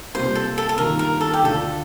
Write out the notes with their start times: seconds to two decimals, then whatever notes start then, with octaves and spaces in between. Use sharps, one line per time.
0.15 C3 G3 A#3 F4 C5
0.35 A4
0.58 A4
0.69 A4
0.78 G2 D#3 G3 A#3 F4 A#4
0.99 A#4
1.21 A4
1.34 G4
1.43 D2 D3 A3 D4 F4 A4